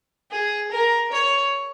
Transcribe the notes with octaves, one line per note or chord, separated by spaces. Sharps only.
G#4
A#4
C#5